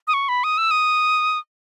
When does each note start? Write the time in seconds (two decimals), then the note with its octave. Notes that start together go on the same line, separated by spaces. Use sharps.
0.08 D#6
0.14 C#6
0.29 B5
0.44 D#6
0.58 E6
0.71 D#6